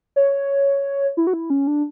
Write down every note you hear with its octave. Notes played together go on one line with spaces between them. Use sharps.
C#5
E4
F#4
E4
C#4
D4